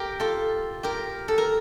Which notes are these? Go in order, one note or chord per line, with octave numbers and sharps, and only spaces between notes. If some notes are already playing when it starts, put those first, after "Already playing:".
Already playing: G4 A#4
F4 A4
G4 A#4
A4
A#4